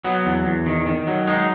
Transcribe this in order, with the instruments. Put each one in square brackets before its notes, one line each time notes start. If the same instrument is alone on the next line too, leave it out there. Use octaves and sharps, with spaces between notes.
[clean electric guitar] F#3 B3
E2
E2
D#3
D#3
F#3
G#3 D#4